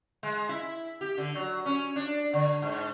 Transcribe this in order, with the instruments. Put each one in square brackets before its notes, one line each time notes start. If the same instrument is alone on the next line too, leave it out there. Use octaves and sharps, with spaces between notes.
[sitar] G#3
E4
G4
D3
F#3
C#4
D4
D3
G#2